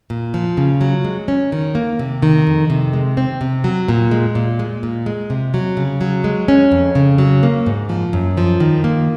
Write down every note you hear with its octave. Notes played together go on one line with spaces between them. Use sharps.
A#2
F3
C#3
F#3
G#3
C#4
D#3
A#3
C3
D#3
F2
C3
G#3
C4
C3
F#3
A#2
G#3
A#2
G#3
A#2
G#3
C3
F#3
C#3
F#3
G#3
C#4
F2
C#3
F#3
A#3
G#2
F3
F#2
F3
D#3
A#3